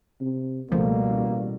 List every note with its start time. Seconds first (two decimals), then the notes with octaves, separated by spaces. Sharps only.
0.20 C3
0.72 C#2 B2 F3 G3 A3 A#3
1.08 A1